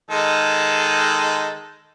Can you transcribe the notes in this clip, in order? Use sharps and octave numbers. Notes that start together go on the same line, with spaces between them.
D#3 G#3 A4